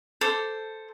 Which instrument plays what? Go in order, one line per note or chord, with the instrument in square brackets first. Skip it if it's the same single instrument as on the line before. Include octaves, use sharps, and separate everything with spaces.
[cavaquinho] A4 C5 D6